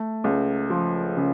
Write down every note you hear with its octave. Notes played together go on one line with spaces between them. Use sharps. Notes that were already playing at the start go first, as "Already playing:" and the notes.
Already playing: A3
C#2
F3
C#3